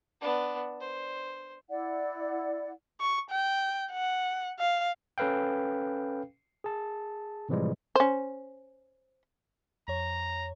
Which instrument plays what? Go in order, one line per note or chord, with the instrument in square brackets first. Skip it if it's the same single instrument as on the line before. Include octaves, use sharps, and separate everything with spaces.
[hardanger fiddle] B3 D4
C5
[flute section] E4 D5 F#5
[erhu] C#6
G5
F#5
F5
[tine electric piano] C#4 A4 B4 F5 G5
G#4 A5
A2 C3 E3 F3 G3 G#3
[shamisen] C#4 C5
[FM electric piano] F2 C#5 [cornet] A#5